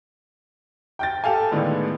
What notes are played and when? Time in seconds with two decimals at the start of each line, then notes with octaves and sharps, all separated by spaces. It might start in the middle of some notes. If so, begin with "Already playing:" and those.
0.99 G5 G6 A6
1.24 G4 A4 F5 G#5
1.51 A2 D3 D#3 G#3 B3